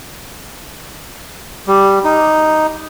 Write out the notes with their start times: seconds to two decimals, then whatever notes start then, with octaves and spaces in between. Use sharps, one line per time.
1.67 G3
2.04 D#4